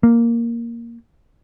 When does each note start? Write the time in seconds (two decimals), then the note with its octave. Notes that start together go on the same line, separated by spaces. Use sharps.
0.03 A#3